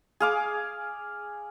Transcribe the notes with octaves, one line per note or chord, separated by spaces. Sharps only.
G#4 F5 D6